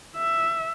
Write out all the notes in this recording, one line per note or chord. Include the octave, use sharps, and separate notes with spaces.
E5